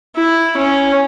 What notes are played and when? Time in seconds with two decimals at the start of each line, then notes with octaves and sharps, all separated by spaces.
0.16 E4
0.57 C#4